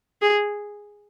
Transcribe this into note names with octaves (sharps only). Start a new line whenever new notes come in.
G#4